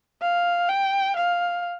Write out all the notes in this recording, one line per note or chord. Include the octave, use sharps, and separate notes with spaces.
F5
G5
F5